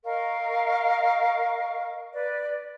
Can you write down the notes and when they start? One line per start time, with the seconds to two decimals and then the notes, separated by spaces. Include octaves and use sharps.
0.05 A#4 D#5 F5 C#6
2.13 B4 D5